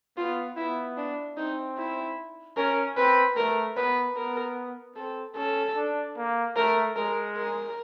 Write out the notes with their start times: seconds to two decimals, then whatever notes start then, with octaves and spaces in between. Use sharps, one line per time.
0.17 B3 F4
0.57 B3 E4
0.97 D4
1.37 C4 D#4
1.78 E4
2.57 C#4 A#4
2.97 C4 B4
3.37 A3 A#4
3.76 B3 B4
4.17 B3 A#4
4.96 C4 A4
5.36 C#4 A4
5.76 D4
6.17 A#3
6.56 A3 A#4
6.96 G#3 A#4
7.37 A#4